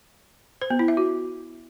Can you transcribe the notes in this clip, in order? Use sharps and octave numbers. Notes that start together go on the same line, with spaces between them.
C5
B3
E4
E5
F#4